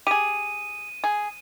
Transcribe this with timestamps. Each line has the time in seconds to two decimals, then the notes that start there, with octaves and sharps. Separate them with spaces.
0.07 G4 G#4 D#7
1.04 G#4